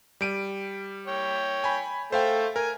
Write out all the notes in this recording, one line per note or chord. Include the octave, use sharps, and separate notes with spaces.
G3 D7 D#7
C#5 G5
G#5 B5
A3 C5 F5 G5
A#4 G#5